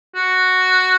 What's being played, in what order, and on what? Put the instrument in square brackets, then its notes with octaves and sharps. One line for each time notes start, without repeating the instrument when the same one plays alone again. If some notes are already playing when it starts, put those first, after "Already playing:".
[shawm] F#4